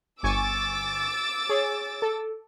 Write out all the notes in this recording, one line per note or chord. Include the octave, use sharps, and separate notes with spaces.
G1 G#5 C#6 D6 E6 A6
G#4 C#5
A4